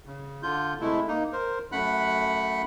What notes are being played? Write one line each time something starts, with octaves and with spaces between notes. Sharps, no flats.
C#3
D3 F4 G6
C3 G#3 A3 E4
A#3 D#4
A#4 C5
F#2 A3 F#5 B5 F#6